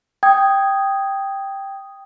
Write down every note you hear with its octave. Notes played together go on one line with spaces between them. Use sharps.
G5 D#6 G#6